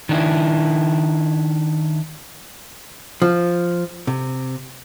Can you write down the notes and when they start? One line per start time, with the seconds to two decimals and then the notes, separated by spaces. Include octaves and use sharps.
0.09 D#3 D4 E4
3.22 F3
4.07 C3